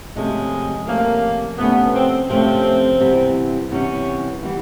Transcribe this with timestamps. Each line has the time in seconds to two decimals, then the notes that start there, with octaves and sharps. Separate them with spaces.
0.16 C3 F3 G#3 A3 C#4
0.87 C3 F3 A3 A#3 C#4
1.58 C3 F3 A3 B3 C#4
1.94 C4
2.29 C3 F3 A3 C4 C#4
3.00 C3 E3 G3 B3
3.71 C3 E3 G3 B3 C#4
4.43 E3 G3 B3